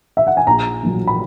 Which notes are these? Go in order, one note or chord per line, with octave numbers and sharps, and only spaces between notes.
E5
F#5
G#5
A#1 A#5
A#2 F#3 A#3
B5